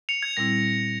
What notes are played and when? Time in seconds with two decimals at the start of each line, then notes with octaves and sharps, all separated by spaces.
0.09 C#7 F7
0.23 G#6
0.37 A#2 G3 C4 E4 A#6